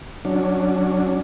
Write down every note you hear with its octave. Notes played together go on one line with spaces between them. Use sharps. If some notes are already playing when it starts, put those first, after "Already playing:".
F#3 C#4 D4